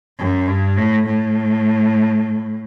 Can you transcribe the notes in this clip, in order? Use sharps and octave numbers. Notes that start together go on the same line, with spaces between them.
F#2
G2
A2
A2